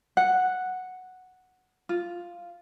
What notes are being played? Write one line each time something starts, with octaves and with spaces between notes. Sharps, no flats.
F#5
F4